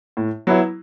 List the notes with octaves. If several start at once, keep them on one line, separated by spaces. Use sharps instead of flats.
A2
F#3 B3 E4